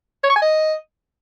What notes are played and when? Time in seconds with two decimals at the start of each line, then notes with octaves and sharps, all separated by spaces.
0.24 C#5
0.30 C#6
0.36 G#5
0.42 D#5